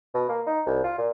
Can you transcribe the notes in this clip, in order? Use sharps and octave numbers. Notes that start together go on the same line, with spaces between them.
B2
A#3
D#4
C2
F4
A#2